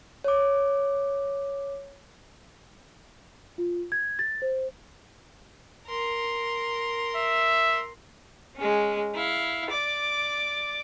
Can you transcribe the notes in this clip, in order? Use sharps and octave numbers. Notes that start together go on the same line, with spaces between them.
C#5 D6
F4
G#6
A6
C5
A#4 C6
E5
G#3 C#4
E4 F5
D5 D6